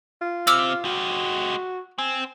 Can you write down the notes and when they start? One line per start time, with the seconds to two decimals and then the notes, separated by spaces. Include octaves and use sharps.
0.21 F4
0.47 C3 C4 D6 E6 F6
0.85 G#3 F#4 G4
1.98 C4 G#5